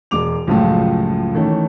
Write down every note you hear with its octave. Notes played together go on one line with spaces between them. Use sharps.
E1 G#3 D6 F7
C#2 F#2 A2 F3 G#3 A3
D#3 E3 A3 C#4